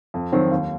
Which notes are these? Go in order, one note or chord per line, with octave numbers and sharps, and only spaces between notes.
F2
D#3 F#3 C4
D#2